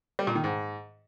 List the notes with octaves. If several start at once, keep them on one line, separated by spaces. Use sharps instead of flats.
G3
A#2
D#3
G#2